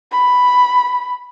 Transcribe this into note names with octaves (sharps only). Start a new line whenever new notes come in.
B5